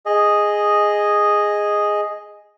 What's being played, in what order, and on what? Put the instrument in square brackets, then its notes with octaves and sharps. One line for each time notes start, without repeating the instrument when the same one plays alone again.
[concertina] G#4 D#5